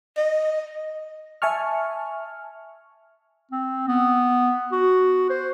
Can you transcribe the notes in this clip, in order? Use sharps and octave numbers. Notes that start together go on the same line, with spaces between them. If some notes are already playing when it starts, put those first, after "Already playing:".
D#5
E5 G#5 A5 C#6 F6
C4
B3
F#4
C5